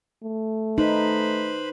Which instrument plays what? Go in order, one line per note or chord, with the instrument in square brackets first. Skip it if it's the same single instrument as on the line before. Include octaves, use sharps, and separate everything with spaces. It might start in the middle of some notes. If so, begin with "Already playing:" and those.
[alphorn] A3
[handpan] D#4 [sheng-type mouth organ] B4 C5 B5